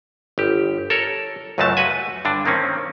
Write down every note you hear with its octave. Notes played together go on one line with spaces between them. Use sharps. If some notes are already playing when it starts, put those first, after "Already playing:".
G1 G4
A4 A#4 C#5
C#2 F#2 F#3 G#3 A3 A5
F#4 B4 G#5
G2 D3 D4
D#3 A#3 C4 C#4